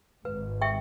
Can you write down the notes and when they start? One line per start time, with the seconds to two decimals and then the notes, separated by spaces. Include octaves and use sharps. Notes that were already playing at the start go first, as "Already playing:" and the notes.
0.25 G#1 G#2 B4
0.62 E5 G5 C#6